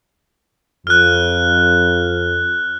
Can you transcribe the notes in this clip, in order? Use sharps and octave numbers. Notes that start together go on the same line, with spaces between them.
F2 F6 F#6